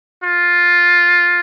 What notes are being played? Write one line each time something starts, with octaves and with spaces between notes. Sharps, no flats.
F4